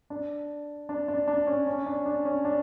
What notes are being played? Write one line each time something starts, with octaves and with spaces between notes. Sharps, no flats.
D4
D4
D4
D4
C#4
C#4
D4
D4
C#4
D4